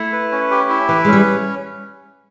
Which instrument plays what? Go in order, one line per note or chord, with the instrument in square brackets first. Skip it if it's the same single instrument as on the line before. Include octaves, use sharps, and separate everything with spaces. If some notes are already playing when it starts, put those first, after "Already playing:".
Already playing: [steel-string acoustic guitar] A3 [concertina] E4
[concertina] B4
C#4
G4
E4
[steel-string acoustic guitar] E3 [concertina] B4
[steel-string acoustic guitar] G#3
[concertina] C#4
[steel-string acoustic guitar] G3